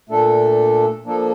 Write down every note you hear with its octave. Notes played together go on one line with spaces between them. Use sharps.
A#2 A3 D4 A4
F3 A#3 D4 A4